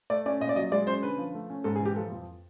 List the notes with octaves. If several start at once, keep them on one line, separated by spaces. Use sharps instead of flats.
A3 D5
C#4 D5
A#2 D#5
D5
F#3 D#5
G#3 D5
C#4 C5
D3 B4
F3
A3
C#4
G#2 A4
G#4
E3
G4
F3 A4
F2